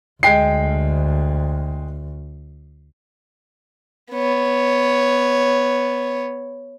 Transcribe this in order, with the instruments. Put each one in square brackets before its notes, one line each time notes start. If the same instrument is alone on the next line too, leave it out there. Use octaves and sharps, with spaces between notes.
[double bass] D2 [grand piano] G#3 G5 C7
[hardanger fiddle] B3 C#5